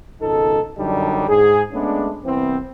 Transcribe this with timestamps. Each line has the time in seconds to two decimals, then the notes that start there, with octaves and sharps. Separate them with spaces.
0.21 G#1 C#2 B2 D#4 A4
0.78 F#2 D3 F#3 G3 D4 D#4
1.29 G#2 G#4
1.73 G#3 A3 B3 C#4 D4
2.25 C2 E3 B3 C4